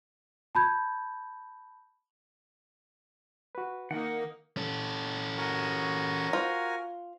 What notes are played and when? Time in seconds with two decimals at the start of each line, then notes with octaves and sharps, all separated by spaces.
0.55 A5 B5 G6 G#6
3.55 F#4 B4
3.91 D#3 A#3 D#4 F#5
4.57 C#4 A4
5.38 F#4 A#4 G#5
6.33 F4 C5